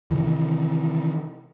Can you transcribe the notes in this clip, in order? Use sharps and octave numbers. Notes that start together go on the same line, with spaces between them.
C3 D#3 E3